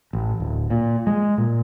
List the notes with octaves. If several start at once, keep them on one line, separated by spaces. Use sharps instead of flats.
A1
D1
A#2
G#3
A#2